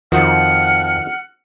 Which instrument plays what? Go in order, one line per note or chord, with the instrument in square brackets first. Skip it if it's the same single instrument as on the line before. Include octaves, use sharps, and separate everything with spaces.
[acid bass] F2 [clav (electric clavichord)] D#3 F3 F#4 [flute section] F#5 F6